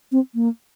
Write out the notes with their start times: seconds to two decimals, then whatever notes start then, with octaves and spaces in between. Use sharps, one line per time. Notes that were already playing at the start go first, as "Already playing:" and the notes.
0.12 C4
0.35 A#3